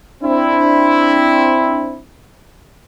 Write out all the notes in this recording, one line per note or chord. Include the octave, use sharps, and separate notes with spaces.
C4 D4 E4